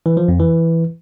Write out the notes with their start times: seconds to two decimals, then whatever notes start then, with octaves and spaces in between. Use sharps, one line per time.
0.06 E3
0.17 F3
0.28 F2
0.40 E3